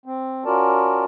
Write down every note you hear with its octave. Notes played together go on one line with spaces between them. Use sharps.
C4
C#4 F4 F#4 A#4 D5 A5